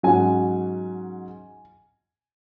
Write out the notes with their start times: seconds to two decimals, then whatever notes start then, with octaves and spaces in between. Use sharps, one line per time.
0.03 G#2 F#3 C#4 G#5